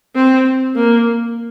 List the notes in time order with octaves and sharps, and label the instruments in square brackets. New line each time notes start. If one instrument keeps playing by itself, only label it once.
[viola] C4
A#3